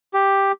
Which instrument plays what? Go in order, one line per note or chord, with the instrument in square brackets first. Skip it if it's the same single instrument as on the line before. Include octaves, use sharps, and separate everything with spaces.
[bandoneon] G4